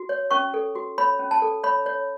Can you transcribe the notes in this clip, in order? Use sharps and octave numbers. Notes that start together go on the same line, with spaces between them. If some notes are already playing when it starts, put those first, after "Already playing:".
Already playing: F#4
C#5
C#4 C#6
A4
F#4
C#5 B5
C#4
A5
A4
C#5 B5
C#5